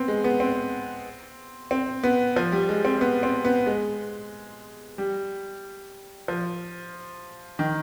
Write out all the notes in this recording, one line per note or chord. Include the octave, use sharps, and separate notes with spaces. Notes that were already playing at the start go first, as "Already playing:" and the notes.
Already playing: B3 C4
G#3
B3
C4
C4
B3
F3
G3
G#3
C4
B3
C4
B3
G#3
G3
F3
D#3